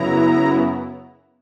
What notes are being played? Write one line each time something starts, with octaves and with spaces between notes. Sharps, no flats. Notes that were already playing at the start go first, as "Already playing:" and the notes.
Already playing: F#2 C#3 F#3 B3 E4 A#5